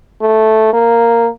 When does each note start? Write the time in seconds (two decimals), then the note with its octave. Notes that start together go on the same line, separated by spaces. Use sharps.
0.21 A3
0.73 A#3